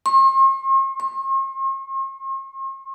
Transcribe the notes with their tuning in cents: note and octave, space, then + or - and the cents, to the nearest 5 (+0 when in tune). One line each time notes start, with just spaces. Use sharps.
C6 +45
C6 +45